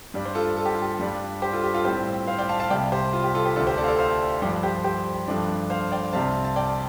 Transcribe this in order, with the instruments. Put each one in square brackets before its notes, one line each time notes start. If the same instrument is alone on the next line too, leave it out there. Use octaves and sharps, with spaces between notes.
[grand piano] G2 G3 D4
C5
F4 A4
A4
G4
F4
G4
G2 G3 D4
G4 C5
F4 A4
G4
F4 A4
A2 G3 C4 G4 C5
C5 F5
D5 G5
F5 A5
F5 A5
C2 C3 G3 D5 G5
G4 C5
F4
G4
F4 A4
G4 C5
D2 D3 A3 D4 F4 A4
G4 C5
A4 D5
F5
A4 D5
C5 F5
G2 F3 D4 G4 C5
G4 C5
G4 C5
G2 F3 A3 D4
C5 F5
D5 G5
C2 C3 G3 C4 F5 A5
A5
D5 G5